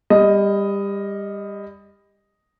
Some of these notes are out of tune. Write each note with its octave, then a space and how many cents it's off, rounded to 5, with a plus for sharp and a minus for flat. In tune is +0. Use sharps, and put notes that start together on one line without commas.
G3 +25 D#5 +0